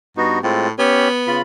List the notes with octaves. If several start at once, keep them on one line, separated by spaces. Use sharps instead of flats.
G2 B3 D#4 F#4
A2 G#3 C4 F4
B3 C#4 G4 C#5
C#3 F4 B5